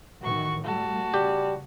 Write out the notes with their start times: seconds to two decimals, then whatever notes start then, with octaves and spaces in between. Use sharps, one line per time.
0.22 A2 D#3 E3 F#4 C#6
0.64 G3 A3 F#4 A5
1.14 C#3 G3 G4